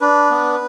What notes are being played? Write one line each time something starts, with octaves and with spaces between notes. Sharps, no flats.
D4 B4
B3